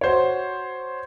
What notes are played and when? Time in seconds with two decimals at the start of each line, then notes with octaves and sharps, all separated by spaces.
0.01 F#4 C5 C#5